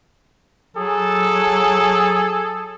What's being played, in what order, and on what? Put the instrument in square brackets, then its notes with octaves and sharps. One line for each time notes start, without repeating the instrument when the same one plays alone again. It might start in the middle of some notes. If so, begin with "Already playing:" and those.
[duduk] F#3 [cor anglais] G#4 [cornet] A4